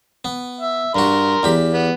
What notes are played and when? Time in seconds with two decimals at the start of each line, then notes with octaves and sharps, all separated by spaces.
0.25 B3
0.61 E5
0.95 G2 F#4 A#4 C6
1.43 E2 G4 B5
1.73 B3